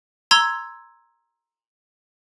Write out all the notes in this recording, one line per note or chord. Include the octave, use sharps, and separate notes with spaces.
A#5 C6 E6 G#6